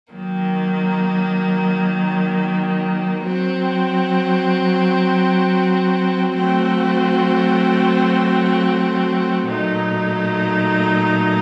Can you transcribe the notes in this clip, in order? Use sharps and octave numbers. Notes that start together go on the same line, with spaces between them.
D#3 F#3 A#3
F#3 C4 F#4
F#3 A3 C4 F#4
A#2 F#3 A3 D#4